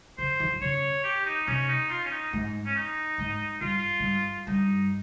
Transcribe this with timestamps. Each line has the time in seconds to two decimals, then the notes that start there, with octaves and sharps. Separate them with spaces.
0.18 C#3 C5
0.40 D#3
0.50 F3
0.61 C#3 C#5
1.04 G4
1.26 D#4
1.47 C3 C#4
1.69 D#4
1.90 F4
2.04 C#4
2.11 D#4
2.33 G#2
2.66 C#4
2.76 D#4
3.18 G#2
3.61 G2 F4
3.99 G#2
4.04 G2
4.47 G2 D#4